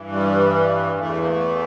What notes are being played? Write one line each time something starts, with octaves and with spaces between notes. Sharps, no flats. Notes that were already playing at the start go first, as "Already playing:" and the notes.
Already playing: G2 E3
G3
E2 E3 A3
A#3
A3